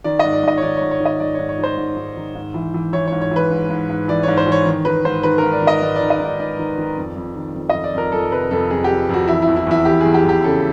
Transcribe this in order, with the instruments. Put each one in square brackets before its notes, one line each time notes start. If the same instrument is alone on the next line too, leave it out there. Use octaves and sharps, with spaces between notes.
[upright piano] D#3 D5
G#2 D#5
D5
G#2 D#5
C#5
D#3 D5
G#2 C#5
C#5
D#3
D#5
G#2 D5
G#2 C#5
C#5
D#3
C5
G#2
G#2
D#3
G#2
E3
E3
E3 C#5
G#2 C#5
C#5
E3 B4
G#2
G#2
G#2
E3 D5
G#2 C#5
C5
E3
C#5
D#3
D#3 B4
G#2 C5
D#3 B4
G#2 A#4
D5
D#3 D#5
G#2 D5
D5
D#3
D#5
G#2 D5
G#2 D5
D#3
D#3
F2
F2
D#3
F2
F2 D#5
D5
F2 A#4
F2 A4
C3 B4
F2 A4
F2 G#4
F2 G4
F2 F#4
E3 E4
E4
E2
E4
E2 E4
E3 G4
E2 G#4
G4
E2 G4
C#3 A4